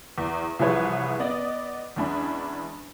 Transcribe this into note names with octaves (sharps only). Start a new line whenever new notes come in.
E2
C2 E3 F3 G#4 B4 C#5
B3 D5 D#5
E2 G#3 C#4 D4 G#5 B5